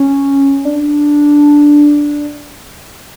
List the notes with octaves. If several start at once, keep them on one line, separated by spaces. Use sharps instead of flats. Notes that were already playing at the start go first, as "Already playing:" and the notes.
Already playing: C#4
D4